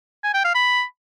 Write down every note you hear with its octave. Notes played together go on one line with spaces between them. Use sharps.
G#5
G5
F5
B5